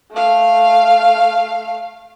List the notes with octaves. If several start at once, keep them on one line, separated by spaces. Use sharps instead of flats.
A3 F5